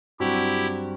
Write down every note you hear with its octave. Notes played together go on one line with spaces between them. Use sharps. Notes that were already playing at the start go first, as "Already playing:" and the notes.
G2 F#3 C4 E4 F#4 G4